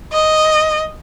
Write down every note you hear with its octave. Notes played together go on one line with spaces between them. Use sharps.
D#5